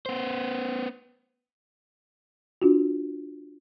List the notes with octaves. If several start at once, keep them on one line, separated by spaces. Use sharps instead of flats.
B3 C5
D4 F4 F#4